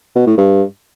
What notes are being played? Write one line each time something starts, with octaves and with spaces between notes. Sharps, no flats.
B2
A2
G2